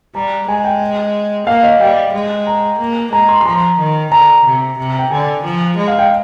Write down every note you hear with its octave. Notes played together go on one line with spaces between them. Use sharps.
G3 A#5
G#3 G#5
G5
A#3 F5
D#5
G3 G5
G#3
A#5
A#3
G#3 A#5
C6
C6
F3 A#5
D#3
D3 A#5
C3
C3
G5
D3 G#5
F3
G#3
F5
G5